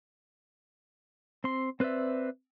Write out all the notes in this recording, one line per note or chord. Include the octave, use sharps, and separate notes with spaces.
C4 C6
C4 B4 C5 D5 E5